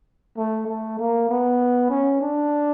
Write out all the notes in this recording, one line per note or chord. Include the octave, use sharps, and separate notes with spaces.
A3
A3
A#3
B3
C#4
D4